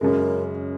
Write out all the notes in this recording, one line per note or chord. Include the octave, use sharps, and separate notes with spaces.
F#2 C#3 G#3 A#4